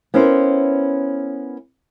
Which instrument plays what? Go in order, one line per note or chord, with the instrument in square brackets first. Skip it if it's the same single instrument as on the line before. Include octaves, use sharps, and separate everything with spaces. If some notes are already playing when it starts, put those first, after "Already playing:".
[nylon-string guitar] B3 C#4 E4 A#4 C5